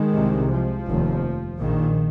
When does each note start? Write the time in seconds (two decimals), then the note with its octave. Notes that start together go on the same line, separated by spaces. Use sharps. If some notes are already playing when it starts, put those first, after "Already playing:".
Already playing: D#3 G#3
0.15 C2 C3
0.51 F3
0.87 F1 D#2
1.59 A#1 A#2 D#3